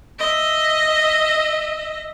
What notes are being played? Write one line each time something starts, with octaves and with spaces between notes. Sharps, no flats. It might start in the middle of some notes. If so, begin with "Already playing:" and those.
D#5 E5